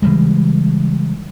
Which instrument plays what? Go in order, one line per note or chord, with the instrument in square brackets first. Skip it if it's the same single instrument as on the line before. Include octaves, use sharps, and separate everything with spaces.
[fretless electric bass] C#3 E3 G3 G#3